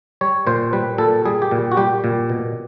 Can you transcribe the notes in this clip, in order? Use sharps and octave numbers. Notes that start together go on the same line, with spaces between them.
G3 C#5
A#2 C5
G3 B4
A#2 A4
G3 G#4
G4
A#2
F#4
G3 G4
A#2
B2